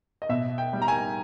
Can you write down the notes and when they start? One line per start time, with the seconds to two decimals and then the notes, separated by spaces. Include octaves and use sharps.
0.22 D#5
0.29 B2 E5
0.58 G5
0.73 G3
0.82 A#5
0.88 G#5